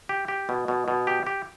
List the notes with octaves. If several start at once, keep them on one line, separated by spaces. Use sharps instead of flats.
G4
G4
B2
B2
B2
G4
G4